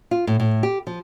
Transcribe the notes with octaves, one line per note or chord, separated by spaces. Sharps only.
F4
A2
A2
G4
F3